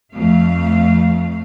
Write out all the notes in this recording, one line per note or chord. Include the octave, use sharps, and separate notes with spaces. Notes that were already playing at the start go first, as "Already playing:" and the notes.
F2 A3 F5